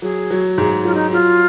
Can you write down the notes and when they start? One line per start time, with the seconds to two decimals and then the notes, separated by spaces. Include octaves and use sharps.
0.02 F#3 G#4
0.31 F#3
0.58 G#2 G#4
0.85 F#3 F4
0.94 D#4
1.13 F#3 F4